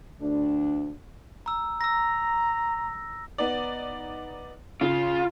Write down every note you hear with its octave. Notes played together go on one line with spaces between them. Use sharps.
D2 D4
A#5 E6
A#5 E6 A#6
B3 D#4 D5
C#3 F4